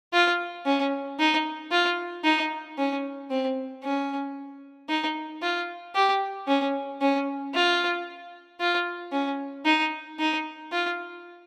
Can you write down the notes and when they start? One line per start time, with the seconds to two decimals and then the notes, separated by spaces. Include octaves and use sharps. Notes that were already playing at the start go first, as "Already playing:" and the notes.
0.13 F4
0.66 C#4
1.19 D#4
1.71 F4
2.24 D#4
2.78 C#4
3.30 C4
3.84 C#4
4.89 D#4
5.42 F4
5.95 G4
6.47 C#4
7.01 C#4
7.54 F4
8.60 F4
9.12 C#4
9.65 D#4
10.19 D#4
10.72 F4